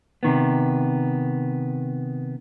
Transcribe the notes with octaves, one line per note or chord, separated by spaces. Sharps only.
C3 D#3 B3